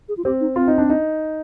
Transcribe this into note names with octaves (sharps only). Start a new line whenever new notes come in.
G#4
F4
C4 G4
D#4
C4 F4
D#4
D4
D#4